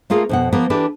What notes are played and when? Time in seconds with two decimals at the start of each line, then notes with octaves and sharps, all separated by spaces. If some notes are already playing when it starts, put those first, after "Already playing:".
0.10 A3 A#3 F4 G#4 A#4
0.29 F2 B2 F#5
0.53 F3 A#3 B3 A#4 B4
0.70 E3 D4 G4 A4 B4